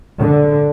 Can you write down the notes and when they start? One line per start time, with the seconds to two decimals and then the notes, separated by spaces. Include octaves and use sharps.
0.18 D3